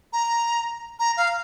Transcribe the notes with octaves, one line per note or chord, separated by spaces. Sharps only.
A#5
A#5
F5